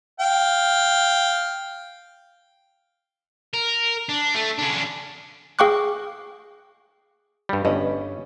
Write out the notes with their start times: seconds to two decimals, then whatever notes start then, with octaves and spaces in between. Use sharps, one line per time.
0.20 F5 G5
3.54 A#4
4.09 D4
4.35 A3
4.58 C#3 D4
5.59 G#4 F5 G5 C#6 D6 F#6
7.49 G2 G3
7.65 G1 G2 C#4 B4 D#5